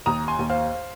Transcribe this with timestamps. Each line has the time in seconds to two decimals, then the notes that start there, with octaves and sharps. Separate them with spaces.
0.06 D#2 A#5 D#6
0.28 G#5 C6
0.39 D#2
0.50 C5 F5